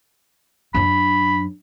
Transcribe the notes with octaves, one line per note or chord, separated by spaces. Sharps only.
F#2 D4 B5